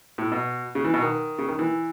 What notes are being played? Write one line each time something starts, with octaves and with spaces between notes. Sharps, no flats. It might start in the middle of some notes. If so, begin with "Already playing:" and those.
A2
B2
C#3
E3
B2
D#3
C#3
D#3
E3